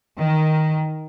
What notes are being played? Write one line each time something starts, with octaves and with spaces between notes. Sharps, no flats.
D#3